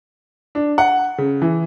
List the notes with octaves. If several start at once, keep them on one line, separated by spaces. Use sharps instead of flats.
D4
F#5
C#3
E3